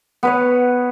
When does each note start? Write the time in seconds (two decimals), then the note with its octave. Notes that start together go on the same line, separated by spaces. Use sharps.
0.23 B3 B4 C#5